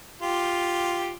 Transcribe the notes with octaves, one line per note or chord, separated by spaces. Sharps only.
F4 G4